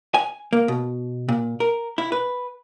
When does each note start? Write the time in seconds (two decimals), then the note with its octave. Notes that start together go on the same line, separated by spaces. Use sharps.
0.14 G#5
0.53 A#3
0.68 B2
1.29 A#2
1.60 A#4
1.98 E4
2.12 B4